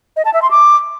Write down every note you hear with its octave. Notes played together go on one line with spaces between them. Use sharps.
D#5
A5
E5
C6
D6